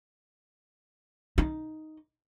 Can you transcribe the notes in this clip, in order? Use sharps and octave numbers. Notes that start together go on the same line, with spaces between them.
D#4